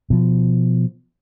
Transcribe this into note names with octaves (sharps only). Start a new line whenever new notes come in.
B2 F3